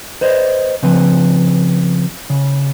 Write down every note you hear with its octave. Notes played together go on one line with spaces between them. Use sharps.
B4 C5 D#5
C#3 F3 C4 B4
C#3